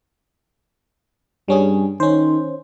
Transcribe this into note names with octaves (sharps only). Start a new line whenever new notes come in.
G2 G3 C#4 G#4
D#3 C#4 C5